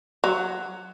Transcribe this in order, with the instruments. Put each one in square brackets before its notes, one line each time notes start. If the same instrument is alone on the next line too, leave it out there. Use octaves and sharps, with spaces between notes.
[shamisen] F#3